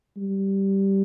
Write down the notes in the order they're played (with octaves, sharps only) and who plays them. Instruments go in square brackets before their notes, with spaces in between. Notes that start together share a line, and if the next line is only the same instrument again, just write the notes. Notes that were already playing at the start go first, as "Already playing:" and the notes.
[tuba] G3